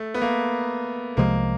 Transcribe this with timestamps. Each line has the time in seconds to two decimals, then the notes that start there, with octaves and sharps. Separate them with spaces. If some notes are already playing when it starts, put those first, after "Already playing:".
Already playing: A3
0.14 B3
0.21 A#3
1.17 C2 C3 F3 G#3 A#3